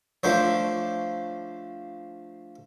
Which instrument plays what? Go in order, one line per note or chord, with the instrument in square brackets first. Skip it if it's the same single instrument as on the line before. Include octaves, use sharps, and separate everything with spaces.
[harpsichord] F3 A3 D4 C5 C#5